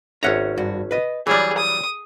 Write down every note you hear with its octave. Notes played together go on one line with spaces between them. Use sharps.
G#1 C#4 C#5 E5 F#5 A#5
G2 F#4
B4 D#5
E3 F#3 G3 G#4 C#5 D5
D#6